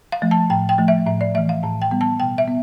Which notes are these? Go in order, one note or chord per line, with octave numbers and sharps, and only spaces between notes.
F5
F3 A3
A5
A2 G5
G5
F3 A3
E5
A2 E5
D5
E3 A3 E5
F5
A2 A5
G5
G3 B3
A5
B2 G5
E5
B3